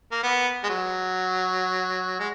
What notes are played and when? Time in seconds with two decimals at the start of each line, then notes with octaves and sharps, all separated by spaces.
0.12 A#3
0.23 B3
0.64 G#3
0.69 F#3
2.19 G#3